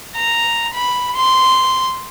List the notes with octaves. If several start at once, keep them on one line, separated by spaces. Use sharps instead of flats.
A#5
B5
C6